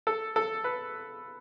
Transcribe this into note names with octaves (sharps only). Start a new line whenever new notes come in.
A4
A4
B4